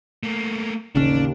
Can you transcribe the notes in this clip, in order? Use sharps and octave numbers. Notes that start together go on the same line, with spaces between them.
A3 A#3
A1 D#2 C#3 C#4 D4